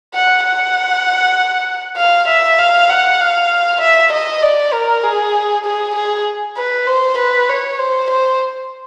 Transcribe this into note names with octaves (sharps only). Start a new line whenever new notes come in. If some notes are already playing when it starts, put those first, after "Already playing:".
F#5
F#5
F5
E5
F5
F#5
F5
E5
D#5
D5
A#4
G#4
G#4
G#4
B4
C5
B4
C#5
C5
C5